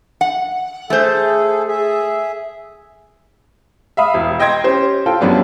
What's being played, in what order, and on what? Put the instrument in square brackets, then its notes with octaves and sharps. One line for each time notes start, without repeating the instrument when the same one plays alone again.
[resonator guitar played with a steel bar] F#5
[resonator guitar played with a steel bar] A3 C5 [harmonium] G#4 A4
[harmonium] G#4 E5
[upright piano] E5 F5 B5 D#6
E1
D#5 G5 C6 G#6 A#6
C#4 G4 C5
F4 A4 G5
F#2 F3 G3 B3 C#4 D4